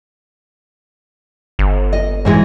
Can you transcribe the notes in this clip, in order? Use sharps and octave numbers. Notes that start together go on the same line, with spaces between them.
G1
D#5
G#2 E3 G#3